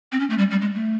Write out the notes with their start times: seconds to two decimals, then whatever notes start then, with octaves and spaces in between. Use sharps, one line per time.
0.12 C4
0.20 C#4
0.30 A3
0.38 G3
0.51 G3
0.62 G#3
0.74 A3